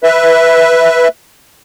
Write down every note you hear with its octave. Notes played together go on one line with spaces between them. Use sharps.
B4 E5